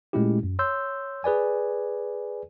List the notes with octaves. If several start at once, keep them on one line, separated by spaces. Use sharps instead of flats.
A#2 G#3 A3 C#4 E4 G4
F#2
C#5 C6 E6 G6
G#4 B4 D5 G#5